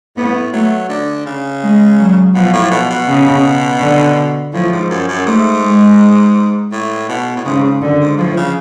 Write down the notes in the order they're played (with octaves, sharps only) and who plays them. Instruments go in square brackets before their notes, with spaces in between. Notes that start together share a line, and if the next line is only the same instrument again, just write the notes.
[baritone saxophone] A2 [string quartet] B3
[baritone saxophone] F#3 [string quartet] A3
[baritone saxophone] D3
C#3
[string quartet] G#3
F#3
[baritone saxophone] B2 [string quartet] F3
[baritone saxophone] A2
B2
B2
[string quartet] C#3
D3
[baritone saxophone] A2 [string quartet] F3
[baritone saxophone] G#2
F#2
F#2
[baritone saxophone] G#2 [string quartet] A3
[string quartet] G#3
[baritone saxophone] A2
B2
A2
[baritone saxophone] G#2 [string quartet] C#3
[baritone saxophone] G#2
[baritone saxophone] F#2 [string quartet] D3
[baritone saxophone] G#2
[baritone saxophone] A2 [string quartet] F3
[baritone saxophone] C#3